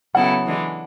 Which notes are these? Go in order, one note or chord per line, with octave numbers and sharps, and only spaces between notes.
C#3 F#3 B3 E4 A4 F#5
E3 G#3 D4